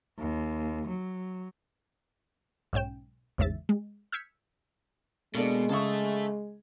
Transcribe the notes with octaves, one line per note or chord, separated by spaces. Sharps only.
D#2
F#3
B1 G#2 C#4 G5 E7
A1 E2 G#2 C#3 E5 A6
G#3
E6 F6 G6 G#6 B6 C#7
B2 G#3 A#3 D4 A4
C#3 G#4 A4 E5 C#6